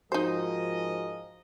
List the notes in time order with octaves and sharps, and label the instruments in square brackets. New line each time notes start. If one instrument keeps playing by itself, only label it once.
[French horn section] G#2 F3 [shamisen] D#4 C5 [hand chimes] F#4 [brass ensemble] G#4 A#4 D#5